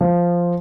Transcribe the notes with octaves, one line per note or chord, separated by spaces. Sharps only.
F3